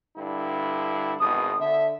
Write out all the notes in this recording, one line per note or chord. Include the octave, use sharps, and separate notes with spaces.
G2 D3 E4
G#1 E2 B2 D#6
D3 E5